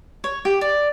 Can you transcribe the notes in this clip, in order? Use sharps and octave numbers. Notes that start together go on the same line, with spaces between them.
C#5
G4
D5